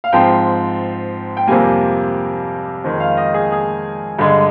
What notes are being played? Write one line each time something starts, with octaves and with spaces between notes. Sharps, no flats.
F5
G#2 F3 C4 G5
G5
F2 C3 G3 A#3 G#5
F2 D#3 G#3
F5
D#5
G#4
G#4
G2 D3 G#3